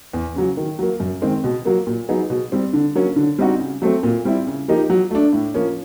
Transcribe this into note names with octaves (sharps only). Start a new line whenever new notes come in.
E2
C#3 F#3
D#3
F#3 A#3
F#2
D#3 G#3 C4
B2
F#3 A#3
A#2
F#3 B3 D#4 G#4
B2
G3 C4
D3
F#3 A#3 C#4
D3
G3 C4 D#4 F#4
C#3
F#3 A3 C4
A#2
G3 C4 E4
C#3
F3 A#3 D#4 G4
F#3
A3 D4
A2
F3 A#3 C#4